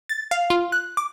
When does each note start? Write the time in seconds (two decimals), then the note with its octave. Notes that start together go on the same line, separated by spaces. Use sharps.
0.09 A6
0.31 F5
0.50 F4
0.72 F#6
0.97 D6